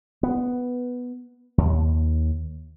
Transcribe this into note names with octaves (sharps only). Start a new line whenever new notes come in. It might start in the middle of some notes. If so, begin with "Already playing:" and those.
B3
D#2